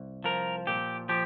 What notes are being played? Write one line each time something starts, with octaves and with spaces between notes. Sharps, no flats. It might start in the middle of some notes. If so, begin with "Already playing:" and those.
Already playing: C2
F3 A#4
A#2 G4
F3 G4